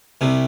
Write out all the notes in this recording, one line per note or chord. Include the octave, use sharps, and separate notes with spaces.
C2 C3